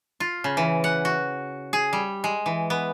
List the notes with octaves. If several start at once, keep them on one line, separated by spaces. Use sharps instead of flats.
F4
C#3
E3
F#5
F#4
G#4
G3
G#3
E3
B3